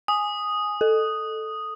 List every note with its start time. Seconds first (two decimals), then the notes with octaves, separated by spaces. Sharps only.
0.08 G#5 D#6
0.81 A4